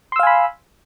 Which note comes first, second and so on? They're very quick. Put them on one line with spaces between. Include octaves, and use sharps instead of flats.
C6 E6 F5 G#5 B5